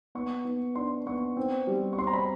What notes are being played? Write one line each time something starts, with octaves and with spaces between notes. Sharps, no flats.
B3 C#6
B3
D4 C6
B3 C#6
C4
G3
C#6
C4 C6
A#5
B5